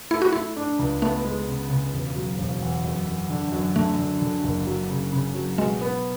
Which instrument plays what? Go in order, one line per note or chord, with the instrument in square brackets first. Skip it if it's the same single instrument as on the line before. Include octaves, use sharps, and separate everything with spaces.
[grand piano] A3 [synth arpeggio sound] E4
[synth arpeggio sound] F#4
[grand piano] A3 [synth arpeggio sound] E4
[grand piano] D4
C#2
[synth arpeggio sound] A3 [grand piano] B3
[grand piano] G#3
C#3
C#3
E1
F#3
E1
E2
F#2
F#2
D3
F#2
[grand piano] D3 [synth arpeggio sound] A3
[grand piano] D3
D3
F#1
F#3
C#3
C#3
F#3
[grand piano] B2 [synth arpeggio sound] G#3
[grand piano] B3